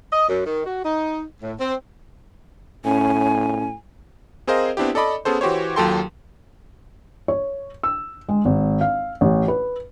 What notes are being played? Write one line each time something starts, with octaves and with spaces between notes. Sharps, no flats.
D#5
F#2
D#3
F#4
D#4
A2
C4
A2 C#4 G#5
C4 G#4 A#4 C5 D#5 F5
B3 C4 D4 E4 G4
A4 D5 D#5 B5 D6
B3 C#4 G#4 A4 C5
E3 F#4 G4 C5 C#5
D#2 F#3 F4 A4 G5 C6
C#5
E6
G#3
G#1
F5
A1
B4